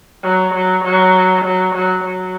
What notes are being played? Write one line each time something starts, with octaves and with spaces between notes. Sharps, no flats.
F#3
F#3
F#3
F#3
F#3
F#3